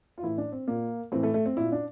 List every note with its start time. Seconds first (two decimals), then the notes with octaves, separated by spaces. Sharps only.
0.18 F4
0.23 A2 E3 E4
0.38 D4
0.52 C4
0.68 A#2 A#3
1.12 A2 E3 C4
1.23 A3
1.34 A3
1.46 C4
1.57 A#2 E4
1.72 D4